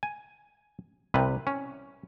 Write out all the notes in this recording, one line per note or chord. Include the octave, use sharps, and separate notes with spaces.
G#5
C2 C3 B4
C#4